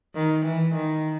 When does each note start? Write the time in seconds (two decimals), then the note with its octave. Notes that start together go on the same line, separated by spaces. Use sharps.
0.15 D#3
0.45 E3
0.75 D#3